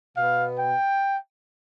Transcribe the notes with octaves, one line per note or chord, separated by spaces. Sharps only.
B2 B3 F5
G5